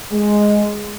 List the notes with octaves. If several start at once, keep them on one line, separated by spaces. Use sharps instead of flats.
G#3